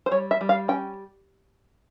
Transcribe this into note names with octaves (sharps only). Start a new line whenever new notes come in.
C5
G3 C#5
E5
G3
F5
C#4 G5